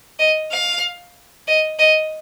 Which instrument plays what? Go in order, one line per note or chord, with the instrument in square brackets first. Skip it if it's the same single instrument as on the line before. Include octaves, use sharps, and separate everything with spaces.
[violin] D#5
F5
D#5
D#5